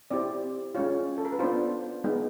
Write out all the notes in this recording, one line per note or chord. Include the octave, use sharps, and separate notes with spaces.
C4 E4 G4 D5
G#3 C#4 F4 C#5
A4
A#4
B4
B3 D4 F4 C5
G#3 B3 D#4